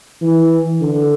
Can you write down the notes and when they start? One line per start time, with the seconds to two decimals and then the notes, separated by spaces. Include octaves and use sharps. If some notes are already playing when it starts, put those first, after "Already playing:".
0.21 E3
0.81 D3